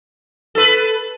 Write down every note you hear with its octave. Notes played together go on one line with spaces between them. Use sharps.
A4 B4